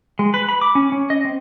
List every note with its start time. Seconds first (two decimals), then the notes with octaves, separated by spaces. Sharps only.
0.19 G#3
0.34 B4
0.49 B5
0.62 D6
0.75 C#4
0.92 C#4
1.10 D#5
1.25 C4